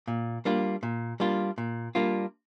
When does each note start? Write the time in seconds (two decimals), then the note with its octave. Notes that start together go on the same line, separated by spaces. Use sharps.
0.08 A#2
0.45 G3 A#3 D4 F4
0.83 A#2
1.20 G3 A#3 D4 F4
1.58 A#2
1.95 G3 A#3 D4 F4